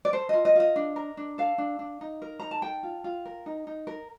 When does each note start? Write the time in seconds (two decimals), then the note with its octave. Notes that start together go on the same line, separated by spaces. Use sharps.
0.05 D5
0.13 A4 C5
0.29 F4 D#5
0.45 D#5
0.55 F4 D#5
0.76 D4
0.96 A#4
1.17 D4
1.38 A4 F5
1.58 D4
1.79 D4
2.01 D#4
2.22 A#4
2.40 D#4 A#5
2.51 A5
2.62 A4 G5
2.83 F4
3.04 F4
3.25 A#4
3.46 D#4
3.67 D#4
3.87 A#4